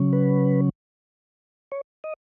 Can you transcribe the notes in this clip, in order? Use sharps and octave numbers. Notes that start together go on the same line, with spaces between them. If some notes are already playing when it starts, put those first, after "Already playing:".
Already playing: C#3 F#3 C#4
B4
C#5
D#5